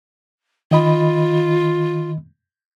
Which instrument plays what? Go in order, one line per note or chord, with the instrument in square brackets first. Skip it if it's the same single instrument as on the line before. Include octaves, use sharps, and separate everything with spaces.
[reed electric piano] D#3 D#5 B5 [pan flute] F4